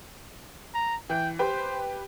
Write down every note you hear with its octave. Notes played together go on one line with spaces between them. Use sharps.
A#5
E3 G5
G4 B4 C5 G5